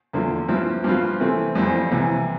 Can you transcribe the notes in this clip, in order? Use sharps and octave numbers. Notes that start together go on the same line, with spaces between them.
E2 D3 F3
G2 F3 C4 E4
G2 F3 C4 F4
C3 E3 A3 C4
F2 E3 G3 C4
C2 C3 E3